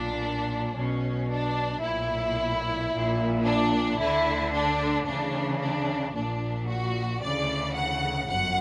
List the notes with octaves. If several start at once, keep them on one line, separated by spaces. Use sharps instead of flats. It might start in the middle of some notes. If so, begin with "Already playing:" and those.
Already playing: B1 A#2 D4
B1 B2 C#4
D4
B1 A#2 E4
A#1 A#2
D4
D2 D3 E4
D4
D2 C#3 E3 D4
D4
A#1 A#2 D4
F#4
D2 C#3 E3 D5
F#5
G1 F#2 F#5